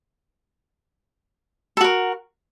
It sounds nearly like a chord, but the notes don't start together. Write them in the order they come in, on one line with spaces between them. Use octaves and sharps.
A4 F#4 A#4